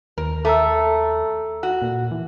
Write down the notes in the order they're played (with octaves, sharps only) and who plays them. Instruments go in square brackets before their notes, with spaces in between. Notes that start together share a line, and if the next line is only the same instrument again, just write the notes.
[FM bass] D#2 [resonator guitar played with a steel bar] A#4
[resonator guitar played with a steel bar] A3 [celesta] A4 A#5 E6
[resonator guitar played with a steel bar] F#4
[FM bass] A#2
E3